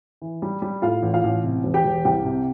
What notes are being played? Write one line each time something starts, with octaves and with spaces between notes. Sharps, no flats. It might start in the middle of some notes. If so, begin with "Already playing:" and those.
E3
G3
G3
A2 F4 F5
A1
F4 F5
A1
C3
E1
G4 G5
E1
C2 G4 G5
C3